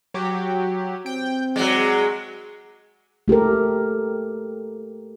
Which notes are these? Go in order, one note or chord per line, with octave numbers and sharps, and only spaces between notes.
F#3 G4
C4 G5
F#3 G#3 D5
A3 G4 A4 A#4